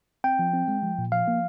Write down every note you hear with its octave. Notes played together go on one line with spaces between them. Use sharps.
C4 G5
F3
C4
G#3
F3
A#2
F3 F5
A#3